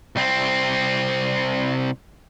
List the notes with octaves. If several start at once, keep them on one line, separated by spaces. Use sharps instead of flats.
C2 C4